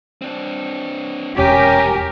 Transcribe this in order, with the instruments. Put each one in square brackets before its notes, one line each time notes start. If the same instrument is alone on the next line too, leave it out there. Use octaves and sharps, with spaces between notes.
[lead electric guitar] C4 D4
[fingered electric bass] E1 [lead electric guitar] C2 G#5 [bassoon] C#4 [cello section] G4 A#4